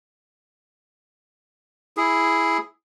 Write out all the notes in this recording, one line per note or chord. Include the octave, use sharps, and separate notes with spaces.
E4 G#4